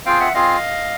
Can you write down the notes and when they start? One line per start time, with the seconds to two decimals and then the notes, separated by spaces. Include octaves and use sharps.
0.06 C4 F4 G#4 F5 G5
0.20 E5 F#5
0.34 C4 F4 G#4 D#5 F5